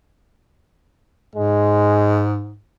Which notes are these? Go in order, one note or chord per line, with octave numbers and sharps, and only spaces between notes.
G#2 G#3